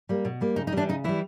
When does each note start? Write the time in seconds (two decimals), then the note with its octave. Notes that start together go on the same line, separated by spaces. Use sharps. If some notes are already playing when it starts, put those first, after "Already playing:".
0.09 G3 A#3
0.25 B2
0.41 G3 A#3
0.56 C#3 D#4
0.67 D#4
0.72 E3 G3 D4
0.89 C#3 D#4
1.04 E3 G3 E4